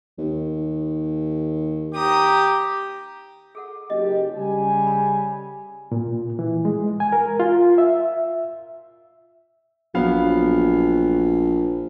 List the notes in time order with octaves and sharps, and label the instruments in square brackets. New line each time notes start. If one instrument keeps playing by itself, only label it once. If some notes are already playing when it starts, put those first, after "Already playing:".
[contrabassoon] D#2
[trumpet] G4 [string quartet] A#5 D#6
[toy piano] G#4 A4 F#5
[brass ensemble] F#1 G4 [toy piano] D#5
[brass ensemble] C#3 G3 G#5
[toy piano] A4 B5
[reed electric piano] A#2
E3
G#3
G#5
A#4
F4
E5
[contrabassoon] A#1 [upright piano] F#3 B3 F5